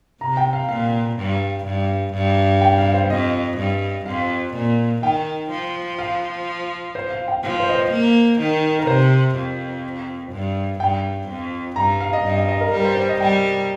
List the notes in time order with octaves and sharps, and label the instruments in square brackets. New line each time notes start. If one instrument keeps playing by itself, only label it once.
[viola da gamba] C3 [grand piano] A#5
[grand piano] G5
F5
[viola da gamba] A#2 [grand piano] F5
[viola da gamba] G2
G2
G2
[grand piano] G5
F5
C5
[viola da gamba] F2 [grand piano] D#5
[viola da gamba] G2
[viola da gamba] F2 [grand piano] F5
[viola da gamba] A#2
[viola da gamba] D#3 [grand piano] G5
[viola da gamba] F3
[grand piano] F5
C5
F5
G5
[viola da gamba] F3 [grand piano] F5
[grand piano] C5
D#5
C5
[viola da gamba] A#3
D#3
[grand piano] A#4
[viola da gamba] C3 [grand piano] C5
[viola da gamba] F2
G2
[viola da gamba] G2 [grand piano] G5
[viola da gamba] F2
[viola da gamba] G2 [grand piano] A#5
[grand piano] F5
D#5
[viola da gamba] G2
[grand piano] D#5
D#5
A#4
[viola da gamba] G3 [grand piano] A#4
[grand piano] C5
C5
D#5
[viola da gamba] G3 [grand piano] G5